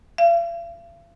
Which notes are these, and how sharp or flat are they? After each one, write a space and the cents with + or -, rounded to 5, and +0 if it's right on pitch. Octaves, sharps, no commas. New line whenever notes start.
F5 -45